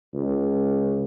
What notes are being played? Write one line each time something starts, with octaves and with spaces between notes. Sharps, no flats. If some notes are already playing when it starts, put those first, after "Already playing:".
C#2